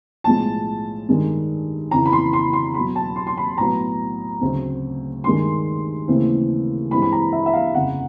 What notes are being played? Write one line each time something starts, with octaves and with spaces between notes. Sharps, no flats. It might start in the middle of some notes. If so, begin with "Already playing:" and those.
B1 A2 F3 G#3 A5
G2 D#3 G#3
F2 C#3 E3 A#5
B5
C6
C6
C6
E2 B2 F#3 B5
A5
C6
C6
B5
B1 A2 F#3 B3 A#5
D2 C#3 F#3 A3 C4
G2 D#3 G#3 C6
D#2 C#3 E3 A3 C4
G2 E3 G#3 C4 B5
B5
A#5
E5
E5
F5
G1 F2 C#3 F#5